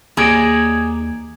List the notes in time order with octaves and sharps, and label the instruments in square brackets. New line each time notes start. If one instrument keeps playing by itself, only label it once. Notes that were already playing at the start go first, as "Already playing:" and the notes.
[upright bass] D#2 [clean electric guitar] D#4 C#5 D5 [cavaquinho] G#4